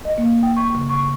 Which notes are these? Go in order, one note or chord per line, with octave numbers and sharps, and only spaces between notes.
D#5
A#3
G5
C#6
C#3
C#6